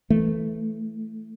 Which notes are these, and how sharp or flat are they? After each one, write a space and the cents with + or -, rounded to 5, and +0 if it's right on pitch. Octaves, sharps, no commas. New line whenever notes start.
E3 +0 A3 +0